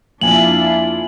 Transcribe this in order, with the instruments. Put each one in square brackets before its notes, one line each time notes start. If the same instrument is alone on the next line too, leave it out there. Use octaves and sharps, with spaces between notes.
[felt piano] F2 A#3 G#5 [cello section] D4 E4 F4 [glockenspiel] F#7